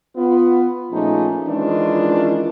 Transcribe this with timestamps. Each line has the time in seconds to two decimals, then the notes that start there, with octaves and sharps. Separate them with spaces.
0.16 B3 F4
0.92 A#2 F3 A3 C#4 D#4 G#4
1.47 D#3 E3 G#3 C#4 D4 F4